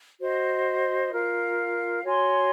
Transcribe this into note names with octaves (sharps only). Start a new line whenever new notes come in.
F#4 C5 D#5
F4 A#4 F5
F#4 C#5 G#5 C6